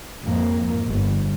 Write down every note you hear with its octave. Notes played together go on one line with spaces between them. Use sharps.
F2 G#2 F3 A#3
G1